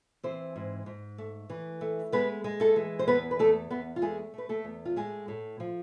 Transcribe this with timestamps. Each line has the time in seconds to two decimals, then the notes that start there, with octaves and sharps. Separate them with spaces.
0.23 E3 C4 C5
0.56 G#2
0.86 G#2
1.18 A3
1.50 E3
1.81 A3
2.12 G#3 B3 B4
2.44 G#3
2.60 A3 A4
2.76 E3
2.99 C5
3.07 E2 B3 B4
3.31 B4
3.39 E2 A3 A4
3.70 E2 B3 B4
3.96 F4
4.02 G#3 A3 G#4
4.34 A3 B4
4.49 A3 A4
4.64 E2
4.85 F4
4.96 A2 G#3 G#4
5.28 A2
5.60 F3